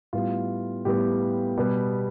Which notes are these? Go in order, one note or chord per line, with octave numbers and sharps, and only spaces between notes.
A2 G3 B3 F4
A2 G3 B3 G4
B2 G3 B3